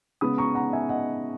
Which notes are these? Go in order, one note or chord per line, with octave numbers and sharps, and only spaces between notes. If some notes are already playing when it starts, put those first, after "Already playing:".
C#3 G#3 B3 B5 D#6
A#5 C#6
F#5 A#5
E5 G#5
D#5 F#5